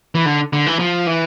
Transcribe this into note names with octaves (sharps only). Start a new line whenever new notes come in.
E3
D3
D3
E3
F3
E3